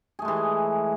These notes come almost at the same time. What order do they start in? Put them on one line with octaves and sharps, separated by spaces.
G#4 A3 G#3 E3